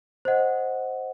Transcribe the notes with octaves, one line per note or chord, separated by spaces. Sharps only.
C5 D#5 F#5